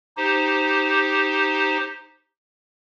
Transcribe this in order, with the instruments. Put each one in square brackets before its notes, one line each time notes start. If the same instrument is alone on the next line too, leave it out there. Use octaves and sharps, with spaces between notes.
[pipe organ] D#4 G4 C5